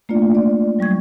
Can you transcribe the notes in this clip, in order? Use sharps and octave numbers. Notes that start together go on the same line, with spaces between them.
A3 A#3 D4 F4 D5
G#3 D5
F#3 G3 C#6 G#6